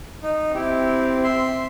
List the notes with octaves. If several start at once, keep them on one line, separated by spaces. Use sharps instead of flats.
D#4
C4 E4 G4
E5 C6